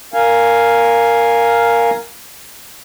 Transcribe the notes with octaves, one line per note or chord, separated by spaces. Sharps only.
A#4 F5 G#5